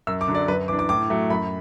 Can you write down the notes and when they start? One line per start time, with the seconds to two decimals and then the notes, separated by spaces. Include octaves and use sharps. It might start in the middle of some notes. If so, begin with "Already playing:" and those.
0.07 F#2 E6
0.21 D6
0.28 D3 F#3
0.35 D5
0.48 F#2 B4
0.68 E3 D4 D6
0.79 D6
0.89 A2 D6
1.10 F#3 A3
1.30 F#2 B5